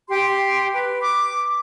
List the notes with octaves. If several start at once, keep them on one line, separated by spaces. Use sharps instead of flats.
G4 C6
B4
D6